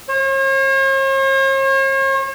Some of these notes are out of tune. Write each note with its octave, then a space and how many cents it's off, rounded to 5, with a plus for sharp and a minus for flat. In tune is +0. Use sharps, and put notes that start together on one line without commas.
C#5 -45